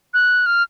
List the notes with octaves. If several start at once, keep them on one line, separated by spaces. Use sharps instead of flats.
F#6
F6